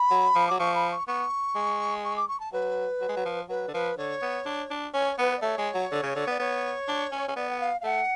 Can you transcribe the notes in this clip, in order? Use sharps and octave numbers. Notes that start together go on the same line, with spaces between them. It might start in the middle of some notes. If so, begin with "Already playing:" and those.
Already playing: B5
F#3
F3
F#3 D6
F3 C#6
B5
C#6
B3 C#6
G#3
C#6
D6
C#6
A5
F#3 B4
F#3
G#3
F#3
F3
F#3 B4
D3
F3 B4
D3 C#5
B3
D4
D4
C#4 C#5
C#5
B3 B4
D5
A3 C#5
G#3
F#3
D3
C#3
D3
B3 D5
B3 C#5
D4
C#4
C#4
B3 D5
F#5
F5
F5
A3 F#5